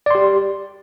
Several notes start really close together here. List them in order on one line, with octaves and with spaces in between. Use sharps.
D5 C6 G4